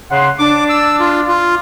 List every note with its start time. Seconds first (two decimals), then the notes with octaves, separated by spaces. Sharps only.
0.11 C#3 F#5 C6
0.39 D4 D6
0.69 E6
1.00 F4
1.28 F4